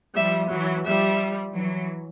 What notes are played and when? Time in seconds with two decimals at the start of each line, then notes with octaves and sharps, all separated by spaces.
0.16 F3 G3 E5
0.51 E3 F#3
0.86 F3 G3 E5
1.56 E3 F#3